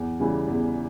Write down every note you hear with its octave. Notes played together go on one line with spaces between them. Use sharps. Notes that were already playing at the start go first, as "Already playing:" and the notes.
Already playing: E2
C#3 E3 G3
E2